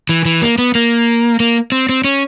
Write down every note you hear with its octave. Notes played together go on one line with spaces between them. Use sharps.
E3
E3
A#3
B3
A#3
A#3
C4
C4
C#4